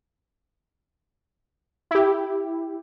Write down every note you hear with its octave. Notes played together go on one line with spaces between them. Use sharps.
E4 G4